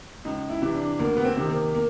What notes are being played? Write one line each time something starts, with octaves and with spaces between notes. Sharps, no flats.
C#2 D#4
E4
C3 E3
D4
D2 A#3
B3
C4
C3 D#3
A#3
A#3